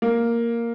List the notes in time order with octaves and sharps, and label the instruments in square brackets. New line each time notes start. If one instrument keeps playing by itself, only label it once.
[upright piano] A#3